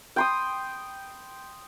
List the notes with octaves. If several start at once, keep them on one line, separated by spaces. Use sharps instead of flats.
G5 C6 D#6